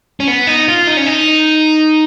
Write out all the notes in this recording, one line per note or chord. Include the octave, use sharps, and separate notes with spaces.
C#4
B3
D#4
F4
D#4
C#4
D#4